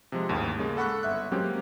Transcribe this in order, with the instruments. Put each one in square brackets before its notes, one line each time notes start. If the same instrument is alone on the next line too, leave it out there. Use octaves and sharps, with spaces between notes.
[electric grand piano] C3 F3 G#3
A1 D#2 G#2
C#3 G#3 A#3
A4 F#5 B5 C#6 F#6
G1 E5 F#6
F#3 G#3 A#3 C4 C#4 G4